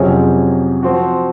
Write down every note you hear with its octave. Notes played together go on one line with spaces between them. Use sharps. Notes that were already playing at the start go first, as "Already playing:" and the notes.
Already playing: F2 C3 F#3 C#4 G#4
F3 C4 F#4